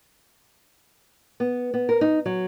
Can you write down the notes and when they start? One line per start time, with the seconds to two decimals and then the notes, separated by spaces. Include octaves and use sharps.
1.40 B3
1.74 B3
1.89 A#4
2.01 D#4
2.26 F#3